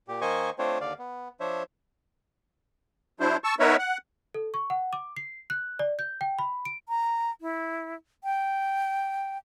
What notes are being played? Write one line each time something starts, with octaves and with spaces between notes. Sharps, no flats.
A#2 G4
D#3 A#3 C5 D#5 G#5 C#6
A3 C4 D4 F4 C5 C#5
D#2 D3 D5 F5
B3
F3 D4 C5 C#5 E5
F#3 D4 E4 C5
A5 C#6 E6
B3 D#4 A#4 B4 C#5 E5
F#5
A4
C#6
F#5
D6
C7
F#6
D5
G6
G5
B5
D7
A#5
E4
G5